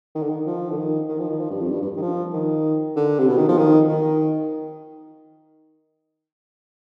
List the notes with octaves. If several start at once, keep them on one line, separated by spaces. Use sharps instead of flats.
D#3
D3
D#3
F3
D3
D#3
D#3
F3
D#3
F3
G2
F2
G2
G2
D#3
F3
D#3
D3
C3
B2
D#3
F3
D#3
D#3